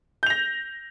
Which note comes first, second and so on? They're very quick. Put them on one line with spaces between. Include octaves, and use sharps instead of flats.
G6 F7 A#6